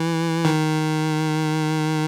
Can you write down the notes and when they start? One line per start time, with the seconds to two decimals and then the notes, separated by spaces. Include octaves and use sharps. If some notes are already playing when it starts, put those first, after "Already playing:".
Already playing: E3
0.45 D#3